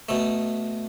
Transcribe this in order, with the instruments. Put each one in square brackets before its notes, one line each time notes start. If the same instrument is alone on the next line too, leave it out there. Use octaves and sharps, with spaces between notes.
[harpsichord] B2 A3